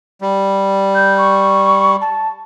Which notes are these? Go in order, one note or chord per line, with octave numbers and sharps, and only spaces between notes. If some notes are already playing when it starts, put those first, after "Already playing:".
G3
G6
C#6
A5